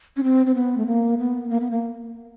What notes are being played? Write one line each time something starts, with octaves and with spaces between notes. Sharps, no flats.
C#4
C4
C4
B3
A3
A#3
B3
A#3
B3
A#3